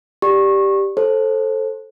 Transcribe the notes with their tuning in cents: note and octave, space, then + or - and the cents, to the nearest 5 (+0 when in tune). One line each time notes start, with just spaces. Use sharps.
G4 +0 D5 +0 C#6 -20
A4 +0 C5 +20